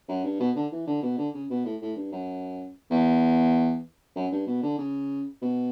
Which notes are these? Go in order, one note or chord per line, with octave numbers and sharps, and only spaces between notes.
F#2
G2
B2
D3
E3
D3
B2
D3
C#3
B2
A2
A2
G2
F#2
E2
F#2
G2
B2
D3
C#3
B2